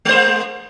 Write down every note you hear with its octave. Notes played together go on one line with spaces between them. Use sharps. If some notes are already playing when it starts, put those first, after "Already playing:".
G#3 A#3 C5